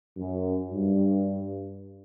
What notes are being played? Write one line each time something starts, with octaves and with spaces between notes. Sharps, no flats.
F#2
G2